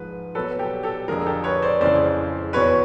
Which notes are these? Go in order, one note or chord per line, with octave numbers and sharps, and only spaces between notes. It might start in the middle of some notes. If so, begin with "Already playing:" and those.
Already playing: G#2 F3 G#3 B4
B2 F#3 A4 B4
G4 A4
G4 A4
F2 D3 F3 G#3 G#4 A#4
G4 A4
B4 C#5
C5 D5
F2 C#3 E3 G#3 C5 D5
E2 B2 F#3 B4 C#5